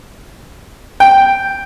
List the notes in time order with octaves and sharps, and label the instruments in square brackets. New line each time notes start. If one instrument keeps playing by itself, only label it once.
[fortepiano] G5